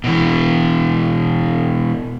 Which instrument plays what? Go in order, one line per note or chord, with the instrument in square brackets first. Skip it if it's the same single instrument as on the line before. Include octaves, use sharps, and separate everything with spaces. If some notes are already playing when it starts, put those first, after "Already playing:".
[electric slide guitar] B2 E3